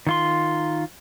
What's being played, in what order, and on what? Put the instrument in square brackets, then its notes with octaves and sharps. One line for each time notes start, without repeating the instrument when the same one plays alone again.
[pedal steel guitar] D#3 F4 C6